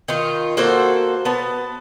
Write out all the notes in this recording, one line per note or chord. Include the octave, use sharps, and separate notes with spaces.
D#3 D#4 F4
A#3 F#4 A4 C5
B3 A5